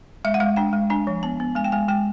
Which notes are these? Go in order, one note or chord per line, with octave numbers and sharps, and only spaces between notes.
G#3 E5
F#5
G#3 F5
D4 G5
G#3
D4 G#5
F3
B3 A5
B3
G#3 G#5
G5
G#3 G#5
G#3 G5